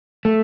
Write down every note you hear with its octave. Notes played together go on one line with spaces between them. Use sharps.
A3